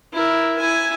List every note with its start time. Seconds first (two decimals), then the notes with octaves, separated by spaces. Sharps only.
0.13 E4 A#4
0.58 E4 G#5